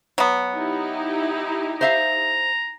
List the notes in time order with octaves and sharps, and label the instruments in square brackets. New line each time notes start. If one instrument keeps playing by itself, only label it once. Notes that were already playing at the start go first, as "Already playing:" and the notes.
[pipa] F#3 B3
[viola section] D#4 E4 G4
[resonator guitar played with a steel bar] C5 E5 F5 [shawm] A#5